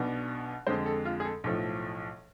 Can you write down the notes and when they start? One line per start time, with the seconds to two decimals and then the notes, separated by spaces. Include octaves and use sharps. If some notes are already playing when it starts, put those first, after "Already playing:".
Already playing: B1 B2 B3 D4
0.67 F2 D3 G#3 C5
0.86 A4
1.05 F4
1.20 G#4
1.25 A4
1.44 B1 A2 F3 A4